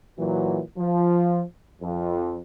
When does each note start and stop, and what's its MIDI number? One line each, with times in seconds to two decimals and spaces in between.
0.18 0.60 46
0.18 0.60 52
0.18 0.60 54
0.77 1.42 53
1.82 2.41 41